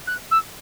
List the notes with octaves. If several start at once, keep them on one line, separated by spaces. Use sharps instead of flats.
F#6
E6